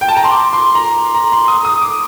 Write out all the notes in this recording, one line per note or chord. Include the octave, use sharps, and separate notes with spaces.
G5
A5
A#5
C6
D6
C6
A#5
A#5
C6
D#6
D#6
D6